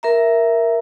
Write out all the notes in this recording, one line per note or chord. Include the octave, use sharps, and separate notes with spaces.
A#4 E5 A#5